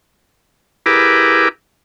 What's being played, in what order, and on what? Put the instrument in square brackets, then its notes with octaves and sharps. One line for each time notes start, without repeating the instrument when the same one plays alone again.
[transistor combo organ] E4 G4 G#4 A#4 B4 D6